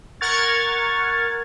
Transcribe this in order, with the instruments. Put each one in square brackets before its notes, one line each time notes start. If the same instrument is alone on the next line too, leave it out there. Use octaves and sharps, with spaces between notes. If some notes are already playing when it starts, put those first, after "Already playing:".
[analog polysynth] A#4 F#5 C#6 F6 G#6 A6